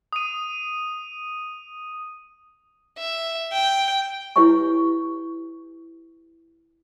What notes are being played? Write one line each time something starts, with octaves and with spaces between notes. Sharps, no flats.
D#6 D#7
E5
G5
E4 G4 B4 C#5 G#5 C#6